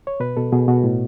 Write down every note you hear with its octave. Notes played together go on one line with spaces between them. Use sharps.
C#5
B2 B4
B2 A4
B2 G#4
B2 F#4
A2